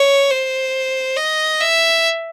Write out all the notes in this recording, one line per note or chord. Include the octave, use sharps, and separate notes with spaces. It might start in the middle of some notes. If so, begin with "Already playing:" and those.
Already playing: C#5
C5
D#5
E5